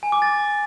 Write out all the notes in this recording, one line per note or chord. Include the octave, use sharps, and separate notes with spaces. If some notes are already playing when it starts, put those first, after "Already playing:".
G#5
D6
A6